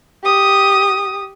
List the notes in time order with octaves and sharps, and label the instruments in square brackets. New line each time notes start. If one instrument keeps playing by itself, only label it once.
[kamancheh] G4 D#6